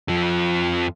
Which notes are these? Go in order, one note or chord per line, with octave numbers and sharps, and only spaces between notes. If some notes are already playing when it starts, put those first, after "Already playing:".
F2 F3